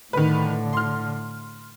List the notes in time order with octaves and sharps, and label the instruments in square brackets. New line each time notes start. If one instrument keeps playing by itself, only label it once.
[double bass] A2 D3 [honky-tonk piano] D#3 B4
[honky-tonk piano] C6 F6